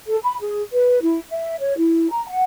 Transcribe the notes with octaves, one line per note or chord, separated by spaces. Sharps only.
A4
B5
G#4
B4
E4
E5
C#5
E4
A#5
F#5